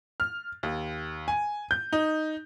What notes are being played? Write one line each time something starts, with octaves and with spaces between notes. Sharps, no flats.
F6
D#2
G#5
G6
D#4